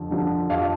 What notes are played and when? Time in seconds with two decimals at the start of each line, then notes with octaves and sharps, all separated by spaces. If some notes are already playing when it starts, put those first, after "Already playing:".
Already playing: F2 D3 F3
0.10 D3 F3
0.50 F2 F5